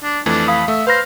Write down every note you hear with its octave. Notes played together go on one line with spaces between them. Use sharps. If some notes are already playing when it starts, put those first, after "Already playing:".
D4
F2 E3 A3 D4
F5 B5 D#6
A3 E5
B4 C5 F5 B5 F6 A#6